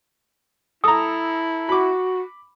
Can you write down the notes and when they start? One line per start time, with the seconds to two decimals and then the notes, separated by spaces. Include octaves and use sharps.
0.84 E4 A4 A#5 D#6
1.69 F#4 B5 D6